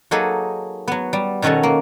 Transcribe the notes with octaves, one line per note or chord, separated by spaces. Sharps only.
F#3 A#3 D#4 G#4 A4 B4
F#3 B3
G3
B2 D#3 C#4 F#4 A4
A#3